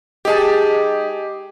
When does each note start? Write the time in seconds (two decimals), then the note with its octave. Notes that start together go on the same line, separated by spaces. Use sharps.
0.25 G#3 D#4 G4 G#4 A5